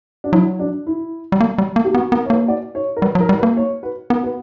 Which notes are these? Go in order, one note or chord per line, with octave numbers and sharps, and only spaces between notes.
D4
F#3 E4
D4
E4
G3
A#3
G3
A#3
G4
B3 F#4
B3 A#4
C#5
A#3 B4
D5
C#5
A#4
G3 B4
F#3
A#4
G3
A#4
B4
A#3
C#5
B4
B3 A#4
B4